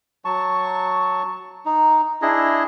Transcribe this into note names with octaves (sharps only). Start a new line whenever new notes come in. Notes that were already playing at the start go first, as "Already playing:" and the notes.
F#3 A5 C#6
D#4
D4 E4 G#4 D#5